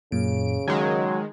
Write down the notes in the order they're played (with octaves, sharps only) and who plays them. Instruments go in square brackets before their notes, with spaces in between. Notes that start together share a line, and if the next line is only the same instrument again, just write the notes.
[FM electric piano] F#2 A#2 [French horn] C#3 [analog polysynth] D7
[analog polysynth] D#3 G#3 [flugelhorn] F#3 [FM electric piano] G#6